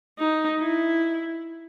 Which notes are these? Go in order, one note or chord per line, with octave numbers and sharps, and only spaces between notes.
D#4
E4